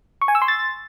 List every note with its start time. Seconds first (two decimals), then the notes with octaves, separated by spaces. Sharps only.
0.22 C#6
0.28 G#5
0.35 E6
0.42 C6
0.48 A6